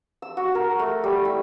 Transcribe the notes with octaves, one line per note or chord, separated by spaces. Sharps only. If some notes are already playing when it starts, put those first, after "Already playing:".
E6
F#4
A#4
A3
G3
E4